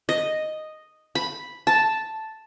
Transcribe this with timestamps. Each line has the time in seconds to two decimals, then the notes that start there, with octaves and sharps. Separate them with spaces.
0.09 D#5
1.15 B5
1.67 A5